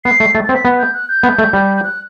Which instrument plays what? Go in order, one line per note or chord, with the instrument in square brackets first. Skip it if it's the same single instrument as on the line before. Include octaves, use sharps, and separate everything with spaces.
[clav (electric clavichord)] B3 [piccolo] C7
[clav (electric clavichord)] A3
[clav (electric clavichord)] A3 [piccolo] A6
[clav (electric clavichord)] C4 [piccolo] A6
[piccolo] B6
[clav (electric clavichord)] B3
[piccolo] G6
F#6
G6
[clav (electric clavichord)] B3
A3
G3
[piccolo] G6
F#6